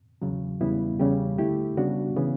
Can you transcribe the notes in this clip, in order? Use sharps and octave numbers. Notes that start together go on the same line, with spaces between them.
E2 C#3 F#3
E2 C#3 G3 B3 E4
E2 C#3 G3 C#4 G4
D2 D3 A3 E4 G4
C#3 G3 B3 D4 F#4
C#3 E3 B3